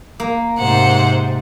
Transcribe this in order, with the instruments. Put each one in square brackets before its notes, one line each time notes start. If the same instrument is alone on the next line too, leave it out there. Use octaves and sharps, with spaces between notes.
[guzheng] A#3
[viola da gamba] G#2 C3 [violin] C5 F#5